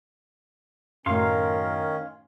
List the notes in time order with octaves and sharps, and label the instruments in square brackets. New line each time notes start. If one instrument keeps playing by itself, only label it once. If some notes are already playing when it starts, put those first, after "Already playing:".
[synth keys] F#2 A2 A3 [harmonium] D#3 C#4 [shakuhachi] A#4 [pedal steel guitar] F5 C6